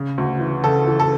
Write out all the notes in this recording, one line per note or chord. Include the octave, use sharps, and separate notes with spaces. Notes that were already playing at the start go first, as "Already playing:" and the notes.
Already playing: C#3
D2
E3
C#3 A4
E3
A4